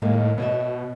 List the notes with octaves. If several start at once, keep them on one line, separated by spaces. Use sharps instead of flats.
A2 D#3 G#3 A#3
B2 C#5 D#5 E5